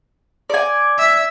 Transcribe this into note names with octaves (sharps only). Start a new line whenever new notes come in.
D5 G#5
E5